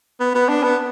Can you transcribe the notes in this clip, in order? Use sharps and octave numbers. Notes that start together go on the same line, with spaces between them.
B3
B3
D4
B3